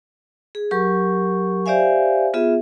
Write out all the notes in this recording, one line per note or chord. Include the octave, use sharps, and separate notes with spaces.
G#4
F#3 G4 A#4 C#6
G4 C5 D5 E5 F5 G#5
B3 F4 G#4 E5